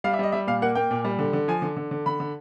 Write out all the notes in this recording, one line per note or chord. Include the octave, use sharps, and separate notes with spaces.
G3 F5
E5
G3 D#5
G3 E5
A#2 F5
A#3 F#5
A#3 G5
A#2
G3
D3
D3
F3 G#5
D3
D3
D3
D3 B5
D3